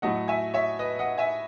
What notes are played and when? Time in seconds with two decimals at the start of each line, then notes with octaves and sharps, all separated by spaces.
0.02 A2 F#3 A3 D#5 F#5
0.28 E5 G#5
0.54 C#5 E5
0.79 B4 D#5
0.99 D#5 F#5
1.18 E5 G#5